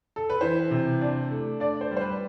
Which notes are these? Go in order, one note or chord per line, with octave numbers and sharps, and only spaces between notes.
A4
B4
E3 C5
C3
D4
A3
D4 D5
C5
G3
C5
B4